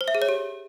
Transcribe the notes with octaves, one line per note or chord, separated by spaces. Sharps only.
C5
E5
G#4
C#5
G4